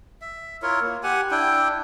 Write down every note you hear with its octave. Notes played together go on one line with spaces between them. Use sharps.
E5
E4 F4 A#4 C#5
A#3
G4 F#5 G#5
D4 E4 G5